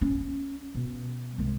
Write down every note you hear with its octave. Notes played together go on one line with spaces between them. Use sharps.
C#4
B2
C2 G#3